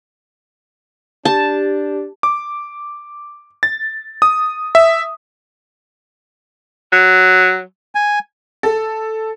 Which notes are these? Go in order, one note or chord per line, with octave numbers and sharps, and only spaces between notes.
D4 G4 A5
D6
A6
D#6
E5
F#3
G#5
A4